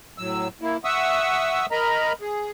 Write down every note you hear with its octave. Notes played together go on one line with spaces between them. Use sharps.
A2 F#3 E6
A#3 E4
E5 F#5 C#6 D#6 E6
A#4 D#5 A#5 B5
G#4